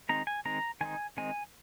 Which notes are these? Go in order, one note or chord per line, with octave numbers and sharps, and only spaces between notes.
D#3 G#3 C4 D#4 A#5
G#5
D#3 G#3 C4 D#4 A#5
D#3 G#3 C4 D#4 G#5
D#3 G#3 C4 D#4 G#5